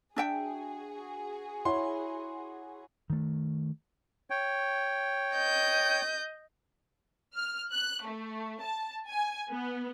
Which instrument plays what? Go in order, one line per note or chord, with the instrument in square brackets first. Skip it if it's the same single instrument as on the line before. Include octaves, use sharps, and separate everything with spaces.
[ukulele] D4 E5 G5 [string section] F#4 G#4
[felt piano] E4 C#5 F#5 [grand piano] C6
[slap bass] D#3 A3
[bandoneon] C#5 G5
[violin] D#5 G6
[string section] F6
F#6
A3
A5
G#5
B3